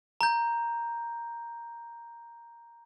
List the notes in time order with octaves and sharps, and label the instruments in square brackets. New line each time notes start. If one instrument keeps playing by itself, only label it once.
[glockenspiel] A#5 G6